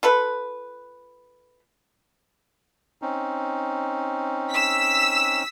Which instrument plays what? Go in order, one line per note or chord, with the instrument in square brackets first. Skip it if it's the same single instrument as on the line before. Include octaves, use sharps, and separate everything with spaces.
[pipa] F4 A4 B4
[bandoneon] C4 C#4 D#4
[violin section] E6 B6